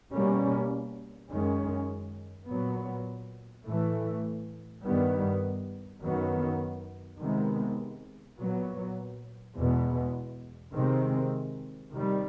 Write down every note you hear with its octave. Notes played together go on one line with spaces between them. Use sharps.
B2 G3 A#3 C#4
F#2 D#3 G#3 C#4
A#2 F#3 B3
A2 E3 A3
G2 D#3 G3 B3
F#2 D#3 F#3 B3
C3 D#3 G#3 B3
A#2 F#3 B3
E2 B2 G#3 B3
C3 D#3 G#3 C4
C3 D#3 G3